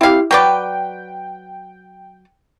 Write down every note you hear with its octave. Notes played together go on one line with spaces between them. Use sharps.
C4 E4 G4 F5
F#3 B4 D5 G5